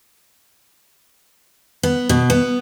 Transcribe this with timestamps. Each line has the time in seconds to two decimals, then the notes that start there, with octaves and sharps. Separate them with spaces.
1.83 B3
2.09 B2
2.30 B3